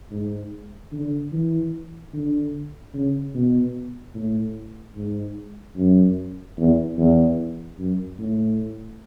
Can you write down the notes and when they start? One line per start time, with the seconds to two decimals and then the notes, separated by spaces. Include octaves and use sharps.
0.11 G#2
0.92 D3
1.32 E3
2.13 D3
2.94 C#3
3.34 B2
4.15 A2
4.96 G#2
5.77 F#2
6.57 E2
6.98 E2
7.78 F#2
8.19 A2